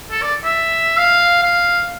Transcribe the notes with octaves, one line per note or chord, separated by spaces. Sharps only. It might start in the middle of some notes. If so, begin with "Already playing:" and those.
A4
D5
E5
F5
F5